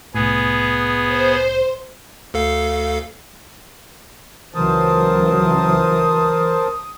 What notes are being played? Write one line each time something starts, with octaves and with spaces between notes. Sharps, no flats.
C2 A2 B3 G#4
C5
D2 A4 F5
C#2 E3 F#3 A#4 C5 A5 D#6